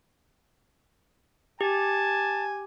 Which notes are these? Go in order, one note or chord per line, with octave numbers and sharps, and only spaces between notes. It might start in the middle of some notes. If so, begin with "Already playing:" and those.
G4 G#5 A5